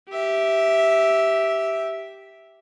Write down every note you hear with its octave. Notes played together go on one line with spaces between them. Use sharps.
G4 E5